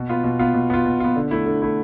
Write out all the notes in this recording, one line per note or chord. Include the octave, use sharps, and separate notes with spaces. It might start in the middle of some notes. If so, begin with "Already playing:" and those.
Already playing: B2
B3 F4
B2
B3 F4
B2
B3 F4
B2
B3 F4
D3
A3 E4
D3
A3 E4